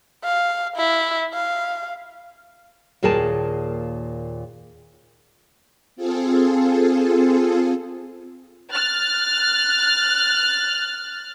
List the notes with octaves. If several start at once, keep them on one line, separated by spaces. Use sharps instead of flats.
F5
E4
F5
D#2 A#2 G#4 A#4 G5 A5
C4 F4 G#4 A4
F6 F#6 A6